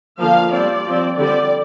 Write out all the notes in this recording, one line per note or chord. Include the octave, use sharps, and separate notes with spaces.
D3 F3 A#3 F5
G3 C4 D5
F3 C4
D3 G3 C4 D5